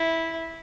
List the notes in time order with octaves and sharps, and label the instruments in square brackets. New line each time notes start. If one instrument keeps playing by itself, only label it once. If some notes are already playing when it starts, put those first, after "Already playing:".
Already playing: [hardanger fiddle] E4